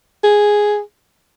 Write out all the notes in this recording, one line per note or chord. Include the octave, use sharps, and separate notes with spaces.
G#4